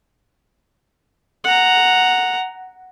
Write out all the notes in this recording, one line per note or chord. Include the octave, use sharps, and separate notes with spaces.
F#5 A#5